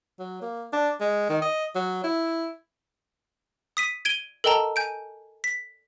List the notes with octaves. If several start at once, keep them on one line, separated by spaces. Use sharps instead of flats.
F#3
A#3
D4
G#3
D#3
D#5
F#3
E4
D#6 B6 D#7
G#6 D7 D#7 G7
A4 A#4 D#5 G5 A5 A#5
G#5 G6 D7
B6